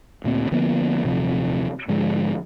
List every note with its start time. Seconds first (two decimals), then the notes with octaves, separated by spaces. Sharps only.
0.24 D2 A#2 A#3 C4
0.51 D3 F3 A#3 B3
1.04 D#1 C3 F3 F#3
1.88 G#2 D3 F3 G#3